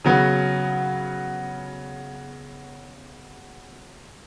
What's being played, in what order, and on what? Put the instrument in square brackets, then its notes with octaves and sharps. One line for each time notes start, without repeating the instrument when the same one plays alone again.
[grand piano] C#3 F#3 B3 F#4